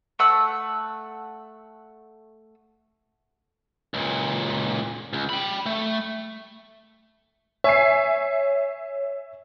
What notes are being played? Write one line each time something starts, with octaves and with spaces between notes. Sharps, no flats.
A3 F#5 E6
C#2 A#2
C#2
G5 B5
A3
C#5 E5 G#5 C7